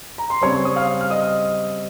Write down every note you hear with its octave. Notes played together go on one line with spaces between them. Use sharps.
A#5
C6
C#3 G3 C4 C#5 C#6
D#6
F5 F6
F6
D#5 D#6